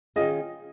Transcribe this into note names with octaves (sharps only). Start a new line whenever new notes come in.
D#3 C#4 F4 G#4 D#5